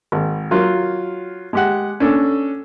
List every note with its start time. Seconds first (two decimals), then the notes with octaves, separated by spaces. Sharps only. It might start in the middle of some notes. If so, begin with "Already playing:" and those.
0.12 G#1
0.51 F#3 F4 A#4
1.53 G#3 G4 F#5
2.00 C#4 D4 A4